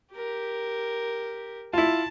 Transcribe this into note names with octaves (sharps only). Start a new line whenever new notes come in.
G4 A#4
E4 F4 A5